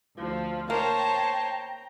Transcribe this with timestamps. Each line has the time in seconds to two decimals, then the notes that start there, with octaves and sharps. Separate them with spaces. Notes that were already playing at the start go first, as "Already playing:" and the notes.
0.16 D2 F3 A4
0.70 A#3 C5 C#5 G5 A5 A#5